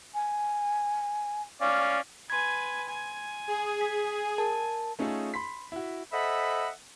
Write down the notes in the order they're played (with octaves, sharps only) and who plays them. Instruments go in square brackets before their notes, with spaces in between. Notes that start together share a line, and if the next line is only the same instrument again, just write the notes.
[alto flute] G#5
[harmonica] C#4 D5 F5
[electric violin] B4 G#5 [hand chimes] C6 G#6
[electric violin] G#5
[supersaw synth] G#4
[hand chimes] B6
A#4 A5
[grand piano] A3 C#4 D#4 F4 G#4 A4
B5 C6 B6
E4 F#4
[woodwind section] A4 C5 D#5 E5 F#5 B5